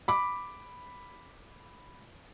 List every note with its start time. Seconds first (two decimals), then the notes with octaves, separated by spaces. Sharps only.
0.08 B5 D6